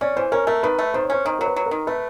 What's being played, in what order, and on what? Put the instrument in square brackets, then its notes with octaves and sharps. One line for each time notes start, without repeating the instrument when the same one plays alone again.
[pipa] C#4 [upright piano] D5
[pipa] E3 [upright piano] C5
[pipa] C#4 [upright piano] A#4
[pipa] A3 [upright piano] A#4
[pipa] D#3 [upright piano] B4
[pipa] A3
[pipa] D#3 [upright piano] C5
[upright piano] C#5
[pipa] C#4 [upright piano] C5
[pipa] D#3 [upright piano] C5
[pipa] F#3 [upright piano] A#4
[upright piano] B4
[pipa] F#3
[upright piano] A#4
[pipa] D#3
[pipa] A3 [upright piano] B4